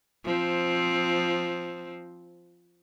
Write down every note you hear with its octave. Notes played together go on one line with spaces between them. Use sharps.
F3 C4